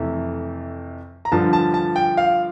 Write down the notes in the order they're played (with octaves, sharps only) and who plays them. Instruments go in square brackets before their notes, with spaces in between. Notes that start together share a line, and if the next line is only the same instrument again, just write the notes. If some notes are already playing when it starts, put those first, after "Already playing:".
Already playing: [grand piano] F2 C3 E3 A3
A#5
G2 D3 F3 A5
A5
A5
G5
F5